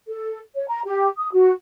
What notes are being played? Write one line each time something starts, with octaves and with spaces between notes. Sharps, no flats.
A4
C#5
A#5
G4
D#6
F#4